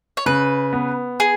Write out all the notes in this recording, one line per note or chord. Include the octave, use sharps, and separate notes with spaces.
C#5
C#3 B4
B3
G#4